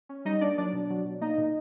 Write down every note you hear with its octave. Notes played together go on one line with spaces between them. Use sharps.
C#4
G3 D#4 D#5
A#3 D4 D5
F#3 D4 D5
B2
F#3
B2
A#3 D#4 D#5
A#2